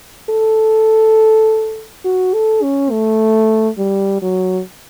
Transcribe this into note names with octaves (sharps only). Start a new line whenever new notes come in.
A4
F#4
A4
C#4
A3
G3
F#3